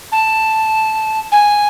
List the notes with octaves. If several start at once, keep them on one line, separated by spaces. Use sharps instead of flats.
A5
G#5